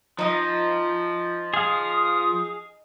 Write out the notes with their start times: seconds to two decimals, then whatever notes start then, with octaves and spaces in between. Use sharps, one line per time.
0.19 F3 D#4 D#5
1.54 G#4 F5 D#6